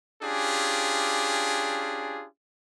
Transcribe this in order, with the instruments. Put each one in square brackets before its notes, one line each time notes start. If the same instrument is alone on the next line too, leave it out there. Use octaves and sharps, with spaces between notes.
[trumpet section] C#4 D4 F4 G4 G#4